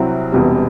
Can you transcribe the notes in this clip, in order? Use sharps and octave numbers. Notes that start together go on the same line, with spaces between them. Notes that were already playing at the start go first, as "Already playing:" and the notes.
Already playing: C2 C3 F#3 C4 E4
E1 E2 C3 G3